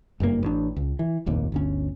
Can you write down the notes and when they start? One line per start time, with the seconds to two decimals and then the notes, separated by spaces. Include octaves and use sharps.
0.20 F#1 G2 C3 A#3
0.43 A1 D4
0.76 C#2
0.99 E3
1.26 F1 A#1 D#2
1.52 G1 D2 C#4